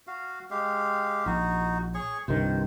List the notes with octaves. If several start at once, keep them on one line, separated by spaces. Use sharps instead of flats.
F#4 F5
G#3 G4 F5
A#1 D#4 F#4
G#4 C#5 C#6
C2 G2 D#3 C5